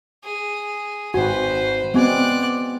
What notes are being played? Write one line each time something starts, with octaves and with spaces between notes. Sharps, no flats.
G#4
G#1 F#4 B4 C5 G#5
G#3 B3 C4 F#4 D5 G#5 F#6